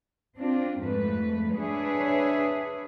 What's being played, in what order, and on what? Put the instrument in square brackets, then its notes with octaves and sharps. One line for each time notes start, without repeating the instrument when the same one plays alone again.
[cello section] C4 D4 F4
F2 G#2 A3 B4
D4 G#4 B4 C#5 E5